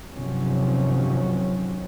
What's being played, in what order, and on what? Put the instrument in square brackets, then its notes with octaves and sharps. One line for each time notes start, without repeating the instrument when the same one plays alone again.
[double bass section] G1 C3 D#3 F3 F#3 C#4